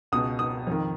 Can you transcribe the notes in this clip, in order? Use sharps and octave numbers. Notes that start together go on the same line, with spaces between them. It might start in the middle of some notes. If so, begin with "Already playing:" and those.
C#2 B2 D#6
D#6
F2 D#3